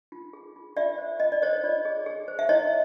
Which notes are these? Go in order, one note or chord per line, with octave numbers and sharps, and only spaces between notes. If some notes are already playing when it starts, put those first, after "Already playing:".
F4
G#4
F4
F4 D5 E5
C5
F4 D#5
D5
C5 C#5 D#5
F4 D5
G#4
G#4
C5
E5
E4 C#5 D#5